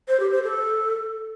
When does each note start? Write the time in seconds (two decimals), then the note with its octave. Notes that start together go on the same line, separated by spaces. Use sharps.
0.08 C5
0.20 G4
0.32 C5
0.43 A4